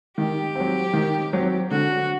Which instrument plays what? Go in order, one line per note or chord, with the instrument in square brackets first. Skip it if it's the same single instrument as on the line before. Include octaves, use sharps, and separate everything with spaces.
[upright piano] D#3 [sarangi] G4
[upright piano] F#3 C4
D#3
F#3 C4
[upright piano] D3 [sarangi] F#4